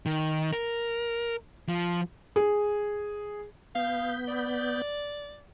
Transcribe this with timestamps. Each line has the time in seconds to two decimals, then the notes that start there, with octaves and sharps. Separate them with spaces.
0.06 D#3
0.53 A#4
1.69 F3
2.36 G#4
3.75 B3 F5 G6
4.28 D5